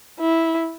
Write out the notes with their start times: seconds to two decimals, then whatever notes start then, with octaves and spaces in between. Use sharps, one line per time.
0.20 E4